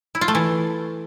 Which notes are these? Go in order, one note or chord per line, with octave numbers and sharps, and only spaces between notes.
E4
F4
A3
E3